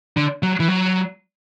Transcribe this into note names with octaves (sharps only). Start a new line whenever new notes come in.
D3
F#3
E3
F#3